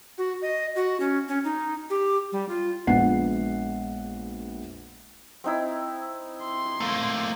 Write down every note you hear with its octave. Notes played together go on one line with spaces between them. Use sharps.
F#4
D#5
F#4
C#4
C#4
D#4
G4
G3
F4
A#1 G#3 B3 F#5 C7
C4 D#4 E4
C6
A3 A#3